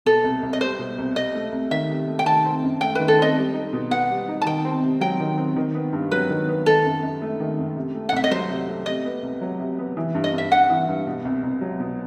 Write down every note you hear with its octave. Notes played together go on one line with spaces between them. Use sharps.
B2 A4
C2
C2
D#5
G3 C5
B2
C2
C3 D#5
A3
C2
D#3 E5
C3
A3
G5
D#3 A5
C4
F#2
A3 G5
D#3 B4
A4
C4 D#5
G3
D#4
B2
B3 F#5
G3
D#4
A5
D#3 G5
C4
C3
F#3 G5
D#3
C4
D#3
B3
G2
F#3 B4
D#3
B3
D#3 A4
F#2
F#2
A3
D#3
F#2
C3
A3
F#5
C2 E5
D#5
F#3 C5
C3
A3
C3 D#5
B3
C2
F#3
C3
B3
E3
G2
D#5
G2 E5
G3 F#5
E3
G2
B2
C2
C2
F#3
B2